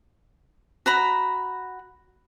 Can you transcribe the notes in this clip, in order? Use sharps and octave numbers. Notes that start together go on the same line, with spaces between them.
F#4 A#5 B5